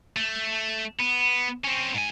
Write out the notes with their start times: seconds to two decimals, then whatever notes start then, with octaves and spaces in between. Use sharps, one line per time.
0.17 A3
0.99 B3
1.64 C4 C#4
1.95 G#2 G#5